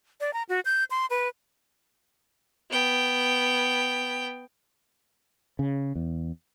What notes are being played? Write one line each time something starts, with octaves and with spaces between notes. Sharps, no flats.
D5
A#5
F#4
G6
C6
B4
B3 G5
C#3
E2